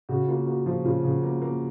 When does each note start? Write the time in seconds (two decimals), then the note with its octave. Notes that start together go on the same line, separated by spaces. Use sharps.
0.09 C#3 F#4
0.28 A#3 F4
0.47 A#3 F#4
0.66 F3 F4
0.85 C#3 F4
1.04 C#3
1.23 A#3
1.41 A#3